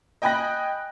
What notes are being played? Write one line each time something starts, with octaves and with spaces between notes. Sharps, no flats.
D#5 G5 G#5 B5 F#6 A#6